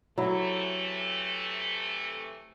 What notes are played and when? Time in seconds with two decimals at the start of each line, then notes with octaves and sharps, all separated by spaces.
0.18 C3 E3 F#3 A3 E4